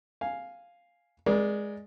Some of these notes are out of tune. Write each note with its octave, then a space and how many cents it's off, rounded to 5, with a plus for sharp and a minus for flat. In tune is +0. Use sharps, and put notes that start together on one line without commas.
F5 +0 G#5 +0
G#3 +0 A#4 +40 D5 +0